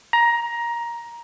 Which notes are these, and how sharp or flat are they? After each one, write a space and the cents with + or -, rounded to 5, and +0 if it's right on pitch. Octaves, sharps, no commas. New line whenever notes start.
A#5 +15